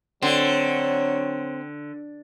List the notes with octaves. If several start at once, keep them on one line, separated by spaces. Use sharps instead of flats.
D3 F#3 C4 C#5